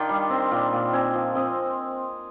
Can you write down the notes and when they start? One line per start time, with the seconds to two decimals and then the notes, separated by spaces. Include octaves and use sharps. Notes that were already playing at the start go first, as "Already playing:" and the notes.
Already playing: D#3 D4 F4 G5
0.09 G3
0.30 C4
0.51 A#2
0.73 A#2
0.93 C4 G#5
1.14 F3
1.35 C4 D#5